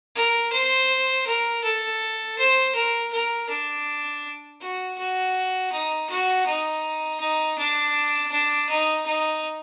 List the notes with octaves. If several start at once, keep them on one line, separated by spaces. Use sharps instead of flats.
A#4
C5
A#4
A4
C5
A#4
A#4
D4
F#4
F#4
D#4
F#4
D#4
D#4
D4
D4
D#4
D#4